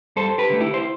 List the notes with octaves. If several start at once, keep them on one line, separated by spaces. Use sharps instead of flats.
G2 A4 C5
G4 B4
D3 A3
E4 G4
C5